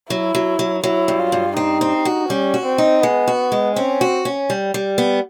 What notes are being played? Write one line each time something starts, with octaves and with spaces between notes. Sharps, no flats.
F#3 E4
F#3
F#3
F#3 E4
G2
F4
G2
C4 D#4
C4
F#4
G3 C#4
F#4
C4
D#4
G#3 B3
F#4
G#3
C4 C#4
F#4
C#4
G3
G3
B3